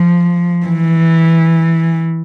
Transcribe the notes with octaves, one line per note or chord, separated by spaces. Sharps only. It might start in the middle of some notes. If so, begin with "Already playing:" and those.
Already playing: F3
E3